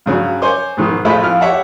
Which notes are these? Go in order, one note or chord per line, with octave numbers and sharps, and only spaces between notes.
G2 C#3 F#3
C5 C#5 G#5 C6 D6
B1 G#2 D#3
A2 F3 G#3 A3 E5 B5
F2 E4 F4 F6
G4 C#5 E5 F#5